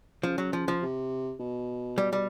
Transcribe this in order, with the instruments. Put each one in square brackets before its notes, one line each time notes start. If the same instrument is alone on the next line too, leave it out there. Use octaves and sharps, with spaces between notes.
[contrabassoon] C#3 [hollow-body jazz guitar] F3
[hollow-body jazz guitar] F#3
F3
F3
[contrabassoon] C3
B2
[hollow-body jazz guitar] G3
G3